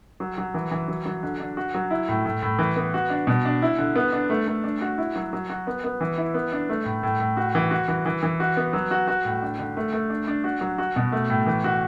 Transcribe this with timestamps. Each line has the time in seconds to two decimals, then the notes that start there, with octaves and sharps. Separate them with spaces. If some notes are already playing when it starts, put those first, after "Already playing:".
0.20 F#3
0.38 F#3
0.54 E3
0.71 E3
0.88 F#3
1.06 F#3
1.23 D3
1.40 D4
1.57 F#4
1.74 F#3
1.91 E4
2.09 A2
2.26 A2
2.43 A2
2.59 E3
2.76 B3
2.94 F#4
3.10 D4
3.27 B2
3.45 D4
3.62 E4
3.78 D3
3.96 B3
4.12 D4
4.30 A3
4.48 A3
4.64 D4
4.81 F#4
4.98 E4
5.16 F#3
5.33 F#3
5.50 F#4
5.67 B3
5.84 B3
6.01 E3
6.18 E4
6.34 B3
6.52 D4
6.69 A3
6.85 A2
7.03 A2
7.20 A2
7.37 F#4
7.55 E3
7.71 F#4
7.88 E3
8.06 E3
8.23 E3
8.40 F#4
8.57 B3
8.73 F#3
8.91 F#4
9.07 F#4
9.25 A2
9.42 D4
9.59 D3
9.77 A3
9.93 A3
10.10 D4
10.27 D4
10.44 F#4
10.61 F#3
10.78 F#4
10.96 B2
11.12 A3
11.30 A2
11.47 E3
11.64 F#4